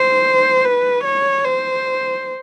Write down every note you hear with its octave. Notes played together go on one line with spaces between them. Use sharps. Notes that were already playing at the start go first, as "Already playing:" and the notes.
Already playing: C5
B4
C#5
C5